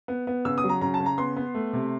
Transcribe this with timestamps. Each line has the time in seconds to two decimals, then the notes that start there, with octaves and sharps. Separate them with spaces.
0.08 B3
0.27 B3
0.45 C#3 E6
0.58 D#6
0.64 F#3
0.69 A#5
0.81 C#3 A#5
0.94 A5
1.00 C#3
1.06 A#5
1.18 B3 C6
1.37 B3
1.55 A3
1.73 C3